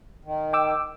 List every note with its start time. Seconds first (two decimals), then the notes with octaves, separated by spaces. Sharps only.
0.24 D#3
0.53 G5 D6 E6